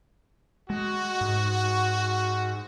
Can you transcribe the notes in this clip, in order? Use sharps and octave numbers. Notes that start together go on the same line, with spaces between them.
G#3 F#4
G#2